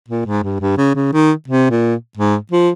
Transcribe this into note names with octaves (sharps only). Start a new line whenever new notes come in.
A#2
G#2
G2
G2
C#3
C#3
D#3
C3
A#2
G#2
F3